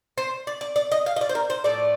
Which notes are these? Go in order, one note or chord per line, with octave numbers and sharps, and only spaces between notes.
C5
D5
D5
D5
D#5
F5
D#5
D5
C5
A#4
C5
A2 F3 A3 D5